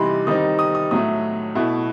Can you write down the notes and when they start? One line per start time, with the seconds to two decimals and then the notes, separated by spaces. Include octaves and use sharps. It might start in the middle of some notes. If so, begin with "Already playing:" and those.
Already playing: C3 E3 G3 D#4 B5 C6
0.27 D#3 G3 C4 D#4 D#6
0.59 D#6
0.75 D#6
0.91 A2 F#3 A3 D#6
1.55 B2 A3 E4